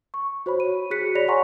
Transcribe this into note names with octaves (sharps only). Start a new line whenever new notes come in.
C#6
F#4 C5 C#5 B5
D#7
F#4 G#4 F#6 B6 C#7
G#4 C#5 D5 B5 A#6 F7
F#5 G#5 A#5 C6 C#6